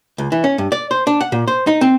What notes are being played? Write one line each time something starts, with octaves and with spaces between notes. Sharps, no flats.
C#2
E3
C#4
G2
D5
C5
D4
F#5
A#2
C5
D#4
C4